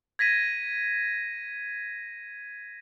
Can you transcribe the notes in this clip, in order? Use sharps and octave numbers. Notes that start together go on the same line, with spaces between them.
G#6 A#6 B6 D#7